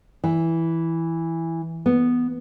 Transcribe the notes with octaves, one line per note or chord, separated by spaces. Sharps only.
E3
B3